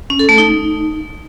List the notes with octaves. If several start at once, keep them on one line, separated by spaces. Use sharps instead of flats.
C#4
A4
A3
D#4